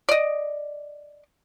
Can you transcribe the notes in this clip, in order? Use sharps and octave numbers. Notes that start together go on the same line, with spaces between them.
D5 D#5